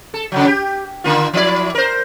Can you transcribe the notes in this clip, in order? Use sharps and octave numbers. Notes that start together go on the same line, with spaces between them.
A4
C#3 F3 F#3
G4
D3 A#3 F4
F3 E4 D5
A#4 C5